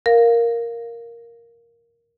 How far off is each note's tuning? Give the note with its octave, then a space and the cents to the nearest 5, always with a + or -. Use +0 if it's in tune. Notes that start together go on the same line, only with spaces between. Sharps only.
A#4 +0 F5 +0